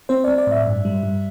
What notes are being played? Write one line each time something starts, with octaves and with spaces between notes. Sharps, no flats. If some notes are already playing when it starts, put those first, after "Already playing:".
C4 C5
C4 D5
D5
A2 E5
G2
G3
G2